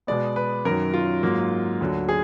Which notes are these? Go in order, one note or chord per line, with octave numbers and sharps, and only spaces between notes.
B2 G#3 B3 D5
B4
F#2 D#3 F#3 A#4
F4
G#2 F#3 A#3
D2 D3 F#3
G#4